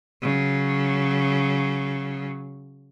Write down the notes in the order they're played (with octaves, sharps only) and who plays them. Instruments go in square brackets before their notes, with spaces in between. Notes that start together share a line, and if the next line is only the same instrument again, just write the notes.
[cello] C#3 F#3